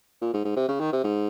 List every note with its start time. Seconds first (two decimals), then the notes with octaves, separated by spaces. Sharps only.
0.22 A#2
0.33 G#2
0.45 G#2
0.56 C3
0.69 C#3
0.80 D#3
0.93 C3
1.04 G#2